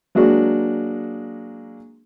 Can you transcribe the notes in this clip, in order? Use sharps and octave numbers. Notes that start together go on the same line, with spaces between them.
F#3 G#3 A#3 D4 F#4